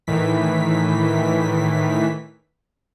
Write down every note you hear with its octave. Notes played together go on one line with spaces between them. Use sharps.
A2 D#3 E3 B6